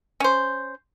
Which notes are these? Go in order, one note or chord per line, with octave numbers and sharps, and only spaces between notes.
C#4 C5